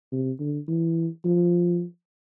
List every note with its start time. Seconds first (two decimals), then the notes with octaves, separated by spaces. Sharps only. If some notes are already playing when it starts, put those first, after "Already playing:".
0.12 C3
0.40 D3
0.68 E3
1.25 F3